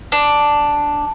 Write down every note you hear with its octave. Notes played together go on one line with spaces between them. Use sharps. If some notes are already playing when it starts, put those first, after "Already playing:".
D4